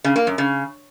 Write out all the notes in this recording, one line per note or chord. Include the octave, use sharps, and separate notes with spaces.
C#3
A#3
F#2
C#3